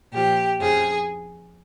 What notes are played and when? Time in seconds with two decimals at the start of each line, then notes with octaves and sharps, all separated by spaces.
0.12 A#2 F3 G4
0.59 F2 C#3 F3 G#4